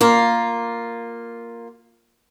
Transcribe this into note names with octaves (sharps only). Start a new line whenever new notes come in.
A#3 F4